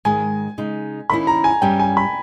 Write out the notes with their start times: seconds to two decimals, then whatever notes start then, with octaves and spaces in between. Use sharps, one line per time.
0.05 G#2 D#3 G#3 G#5
0.58 C#3 G#3 D#4
1.10 D#3 A#3 C#4 E4 B5
1.27 A#5
1.44 G#5
1.62 G2 G3 C#4 E4 G4 G5
1.79 G#5
1.97 B5